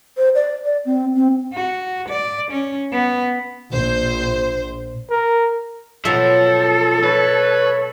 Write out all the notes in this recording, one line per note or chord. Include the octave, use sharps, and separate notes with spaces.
C5
D5
D5
C4
C4
F#4
D5
C#4
B3
A#1 C5
A#4
B2 F3 F#3 A4 E5
B4 C#5